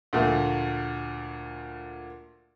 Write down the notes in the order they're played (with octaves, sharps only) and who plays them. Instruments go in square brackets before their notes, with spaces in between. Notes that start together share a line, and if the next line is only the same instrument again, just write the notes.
[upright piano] D2 A#2 F3 A3